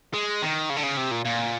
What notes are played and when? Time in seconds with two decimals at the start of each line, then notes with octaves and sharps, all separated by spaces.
0.14 G#3
0.42 D#3
0.70 C#3
0.77 D3
0.83 C#3
0.97 C3
1.11 A#2
1.25 A#2